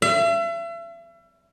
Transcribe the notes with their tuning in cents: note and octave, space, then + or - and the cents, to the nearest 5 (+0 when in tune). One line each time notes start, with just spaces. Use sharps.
E5 +40